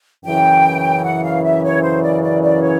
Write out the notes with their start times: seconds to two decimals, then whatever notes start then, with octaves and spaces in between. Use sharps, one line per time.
0.24 F#2 C#3 E3 G5
1.04 F#5
1.23 F5
1.43 E5
1.63 C#5
1.82 C5
2.02 D5
2.23 D5
2.42 D5
2.62 C#5